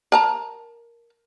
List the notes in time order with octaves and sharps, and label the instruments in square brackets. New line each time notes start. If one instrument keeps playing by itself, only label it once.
[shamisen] A#4 A5 A#5